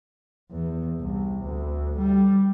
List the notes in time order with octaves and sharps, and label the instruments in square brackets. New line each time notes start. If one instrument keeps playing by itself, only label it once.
[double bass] E2
C2
D2
G3